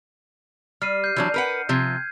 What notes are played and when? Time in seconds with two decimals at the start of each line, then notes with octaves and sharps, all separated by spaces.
0.82 G3 F6 C7 D#7
1.04 G6 C7
1.16 E3 F#3 D4
1.34 A#4 B4 F#5
1.69 C3 F3 G6 G#6